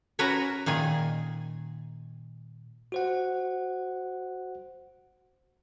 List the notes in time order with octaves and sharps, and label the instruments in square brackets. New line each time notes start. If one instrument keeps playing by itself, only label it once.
[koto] C#4 F#4 A#4 B4 C#5
A#2 D#3 G#4 G#5
[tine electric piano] F#4 C5 F#5